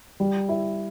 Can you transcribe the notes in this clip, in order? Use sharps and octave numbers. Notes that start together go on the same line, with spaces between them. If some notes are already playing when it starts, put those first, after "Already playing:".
G3
E4